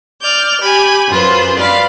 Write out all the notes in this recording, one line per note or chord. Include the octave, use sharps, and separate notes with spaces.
D5 F6 G6
G4 G#5 B5
F#2 F4 B4 C5
B4 D5 F5 B5